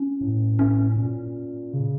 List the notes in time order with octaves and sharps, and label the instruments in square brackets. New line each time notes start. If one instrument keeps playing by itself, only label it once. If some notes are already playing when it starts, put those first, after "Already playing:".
Already playing: [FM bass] C#4
[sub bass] A2
[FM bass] C#4
[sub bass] A#2
C#3